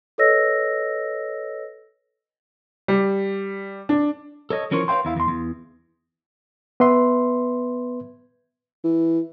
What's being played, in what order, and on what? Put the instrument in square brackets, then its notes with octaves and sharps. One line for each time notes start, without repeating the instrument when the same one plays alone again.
[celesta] A4 B4 C#5 D#5 E6 A#6
[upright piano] G3
D4
[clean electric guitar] A4 C#5 D#5
E3 F3 C#4 A#4 C5 C#5
B4 C#5 D#5 F5 G5 C6
E2 E4 F5
E2 C6
E2
[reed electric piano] B3 B4 E5 C6
[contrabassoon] E3